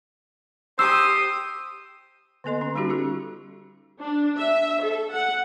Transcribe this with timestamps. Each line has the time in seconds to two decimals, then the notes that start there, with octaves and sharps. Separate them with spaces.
0.79 G4 C5 D#6 E6
2.44 D3 A#3 B3 A4 D#5 C6
2.61 D3 C#4
2.75 G3 C#4 D#4 F#4 G4
2.89 C#4 F4 G4 A4
4.01 D4
4.39 E5
4.83 A4
5.11 F#5